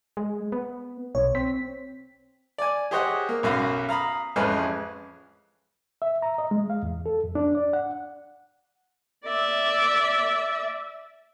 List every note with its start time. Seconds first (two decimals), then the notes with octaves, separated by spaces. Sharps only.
0.17 G#3
0.52 B3
1.15 B1 C#5
1.35 C4 B6
2.58 D5 G#5
2.91 G4 G#4 C5 C#5 D#5 F#5
3.29 A#3
3.43 B1 F#2 C#4 F#4 F5
3.89 F5 A#5 B5 D#6
4.36 A1 F2 G#3 C#4 B4 F6
6.02 E5
6.22 A#5
6.38 D#5
6.51 G#3
6.70 F5
6.83 E2
7.06 A4
7.24 F2
7.35 D4
7.55 D5
7.73 F#5
9.25 D5 E5